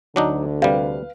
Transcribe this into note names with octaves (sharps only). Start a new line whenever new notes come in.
D2 D3 F#3 D4 D#4
C3 G3 B4 F5